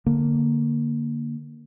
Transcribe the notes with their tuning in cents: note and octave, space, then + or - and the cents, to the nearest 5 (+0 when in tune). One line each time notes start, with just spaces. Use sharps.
D3 +0 A#3 +0